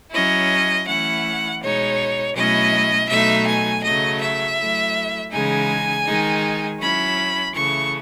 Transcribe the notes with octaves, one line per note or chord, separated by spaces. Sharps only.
F#3 C#4 E4 D#5
E3 A3 C#4 E4 F#5
B2 G#3 D#4 C#5
B2 F#3 A3 C#4 E4 D#5
B2 F#3 A3 D#4 E5
G#5
C#3 F#3 A3 D#5
E5
F#3 A3 E4
C#3 E3 G#3 D#4 G#5
D#3 G#3 D#4
F#3 C#4 E4 B5
C#3 E3 A3 C#6